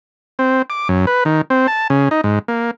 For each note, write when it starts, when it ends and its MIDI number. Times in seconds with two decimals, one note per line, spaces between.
0.39 0.62 60
0.70 0.88 86
0.89 1.06 42
1.07 1.24 71
1.25 1.41 51
1.50 1.67 60
1.67 1.88 81
1.90 2.09 49
2.11 2.21 63
2.24 2.39 44
2.48 2.71 58